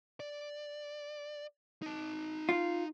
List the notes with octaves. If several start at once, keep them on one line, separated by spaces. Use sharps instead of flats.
D5
D#4 A5
F4